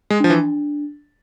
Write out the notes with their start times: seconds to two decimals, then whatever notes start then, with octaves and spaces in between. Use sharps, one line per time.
0.10 G#3
0.20 F3 D4
0.30 E3